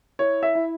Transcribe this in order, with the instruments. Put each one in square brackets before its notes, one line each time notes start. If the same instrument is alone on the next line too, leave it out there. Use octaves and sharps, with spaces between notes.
[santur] E4 [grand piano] C#5
[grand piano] E5
[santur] E4